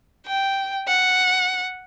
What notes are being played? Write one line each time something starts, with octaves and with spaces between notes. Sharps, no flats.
G5
F#5